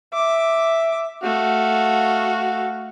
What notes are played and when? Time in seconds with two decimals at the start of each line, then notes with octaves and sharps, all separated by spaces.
0.13 E5 D6
1.23 A3 F#4 F5